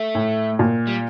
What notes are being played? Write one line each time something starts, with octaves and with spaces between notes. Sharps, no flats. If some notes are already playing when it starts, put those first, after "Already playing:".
Already playing: A3
A2
A#2
G3